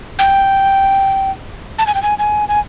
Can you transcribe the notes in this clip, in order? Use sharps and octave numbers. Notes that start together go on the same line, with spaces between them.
G5
A5
G#5
G5
G#5
G#5
G#5